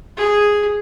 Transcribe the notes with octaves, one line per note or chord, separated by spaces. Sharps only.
G#4